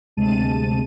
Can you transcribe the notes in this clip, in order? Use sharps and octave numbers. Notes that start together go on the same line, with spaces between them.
G1 D2 C3 G#3 A5 D#7